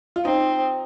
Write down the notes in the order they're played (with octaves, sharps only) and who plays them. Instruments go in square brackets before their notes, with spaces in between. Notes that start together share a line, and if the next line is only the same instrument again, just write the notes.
[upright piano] F4
[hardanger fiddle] C4 [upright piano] D#4